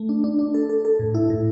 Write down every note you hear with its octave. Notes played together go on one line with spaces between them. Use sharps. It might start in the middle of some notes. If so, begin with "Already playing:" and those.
Already playing: A3
D4
D4
D4
A4
A4
A4
A2
E4
A2